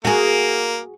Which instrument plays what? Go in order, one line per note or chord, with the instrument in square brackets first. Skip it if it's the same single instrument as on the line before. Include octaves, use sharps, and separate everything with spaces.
[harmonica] A#3 [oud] F#4 G#4